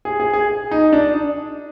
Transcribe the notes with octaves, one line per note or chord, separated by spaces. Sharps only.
G#4
G#4
G#4
D#4
D4